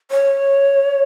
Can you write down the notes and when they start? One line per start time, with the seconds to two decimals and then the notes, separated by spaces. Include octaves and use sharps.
0.11 C#5